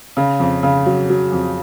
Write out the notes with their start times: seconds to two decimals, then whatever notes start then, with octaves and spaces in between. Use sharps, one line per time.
0.17 C#3
0.40 F2
0.63 C#3
0.86 F#3
1.10 F#3
1.32 F2